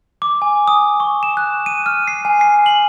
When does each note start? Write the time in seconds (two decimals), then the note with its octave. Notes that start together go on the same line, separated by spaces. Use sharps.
0.22 D6
0.42 G#5
0.68 D#6
1.00 C#6
1.23 E7
1.37 F#6
1.66 D#7
1.86 F6
2.08 C7
2.25 G#5
2.41 C7
2.66 F#7